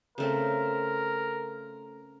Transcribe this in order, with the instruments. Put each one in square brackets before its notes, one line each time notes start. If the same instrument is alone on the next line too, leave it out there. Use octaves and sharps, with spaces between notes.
[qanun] C#3 A3 C4 [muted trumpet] A#4